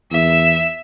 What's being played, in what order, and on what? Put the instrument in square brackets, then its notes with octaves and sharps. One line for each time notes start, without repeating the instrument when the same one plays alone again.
[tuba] E2 [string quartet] E5